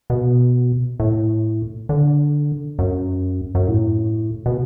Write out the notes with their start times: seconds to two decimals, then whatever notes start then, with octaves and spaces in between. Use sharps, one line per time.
0.10 B2
1.00 A2
1.89 D3
2.79 F#2
3.55 F#2
3.68 A2
4.46 B2